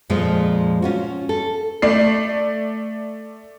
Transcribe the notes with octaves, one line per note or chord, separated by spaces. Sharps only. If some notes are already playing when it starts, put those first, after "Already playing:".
F2 A#2 F3 G#3
C#4 F4 F#4
A4
A3 D5 C7